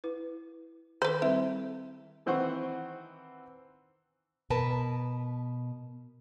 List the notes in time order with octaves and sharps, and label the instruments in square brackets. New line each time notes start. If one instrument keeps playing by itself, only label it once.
[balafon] E4 B4
[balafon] D#3 A4 [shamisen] B4 C5
[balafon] G3 C4 [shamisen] E4
[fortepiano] D#3 E3 C4 C5 F#5 C#6
[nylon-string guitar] B2 A#4 B4 A5